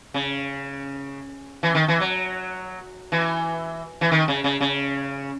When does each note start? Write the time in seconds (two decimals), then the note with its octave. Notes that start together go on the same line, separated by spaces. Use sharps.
0.14 C#3
1.63 E3
1.75 D#3
1.88 E3
2.00 F#3
3.12 E3
4.01 E3
4.11 D#3
4.28 C#3
4.44 C#3
4.61 C#3